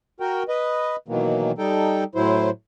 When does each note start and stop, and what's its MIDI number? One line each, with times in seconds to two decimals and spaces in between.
0.20 0.43 66
0.20 0.43 70
0.20 0.43 79
0.48 0.96 71
0.48 0.96 75
1.08 1.52 47
1.08 1.52 51
1.08 1.52 52
1.08 1.52 54
1.08 1.52 58
1.58 2.04 55
1.58 2.04 63
1.58 2.04 69
1.58 2.04 79
2.15 2.50 45
2.15 2.50 54
2.15 2.50 64
2.15 2.50 72